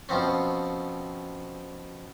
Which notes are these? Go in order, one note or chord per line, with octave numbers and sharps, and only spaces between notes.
B2 F3 C4 C#4